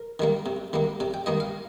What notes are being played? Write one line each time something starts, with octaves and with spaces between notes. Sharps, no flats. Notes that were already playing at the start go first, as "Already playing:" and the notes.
Already playing: A#4
D#3 G3 A#3
C3
D#3 G3 A#3
C3 D5
G5
D#3 G3 A#3 D#5
F5